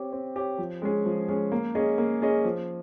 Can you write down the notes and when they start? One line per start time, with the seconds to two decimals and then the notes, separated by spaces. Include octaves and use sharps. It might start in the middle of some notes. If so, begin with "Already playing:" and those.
Already playing: C4 G4 C#5
0.12 C4
0.36 G4 C#5
0.58 F3
0.82 G#3 C#4 G#4
1.05 F3
1.29 G#3 C#4 G#4
1.52 A#3
1.75 C#4 G#4 D#5
1.98 A#3
2.22 C#4 G#4 D#5
2.44 F3